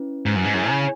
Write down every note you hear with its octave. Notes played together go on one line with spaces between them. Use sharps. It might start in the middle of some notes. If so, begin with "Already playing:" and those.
Already playing: C#4 E4 B4
G#2
F#2
G#2
F#2 E4 G#4 C#5 G#5
C#3